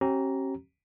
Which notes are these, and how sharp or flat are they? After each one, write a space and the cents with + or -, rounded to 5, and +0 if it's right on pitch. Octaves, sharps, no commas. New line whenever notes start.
C#4 -45 G4 -40 A#5 +0